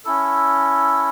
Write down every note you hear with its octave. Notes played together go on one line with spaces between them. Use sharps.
C#4 E4 A4